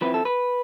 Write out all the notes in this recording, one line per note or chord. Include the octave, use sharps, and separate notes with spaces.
F3 C4 E4 B4
A4
B4